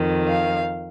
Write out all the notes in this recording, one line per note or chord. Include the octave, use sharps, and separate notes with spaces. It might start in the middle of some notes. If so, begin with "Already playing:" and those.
Already playing: F2 D#3
F5